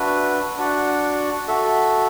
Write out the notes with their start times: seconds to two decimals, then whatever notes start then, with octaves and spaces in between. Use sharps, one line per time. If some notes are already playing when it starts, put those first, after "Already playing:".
Already playing: D4 F#4 B4 E5
0.57 D4 F#4 D5 F#5
1.48 F#4 A4 E5